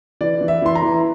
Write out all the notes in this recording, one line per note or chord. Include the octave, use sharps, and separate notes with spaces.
E3 D5
E3
E5
E3 C6
A#5
E3